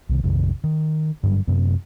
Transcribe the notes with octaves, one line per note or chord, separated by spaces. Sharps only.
C2 C3 D#3
A#1 F2 C3 D#3
D#3
G2 D3 F#3 G3
F#2 C3 B3